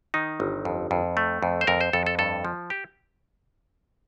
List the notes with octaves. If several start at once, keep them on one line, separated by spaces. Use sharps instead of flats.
D#3 D#4
G1
F2
F2
A3
F2
C5
F2 A#4
C5
F2 A4
A4
G2 A4
F3
G4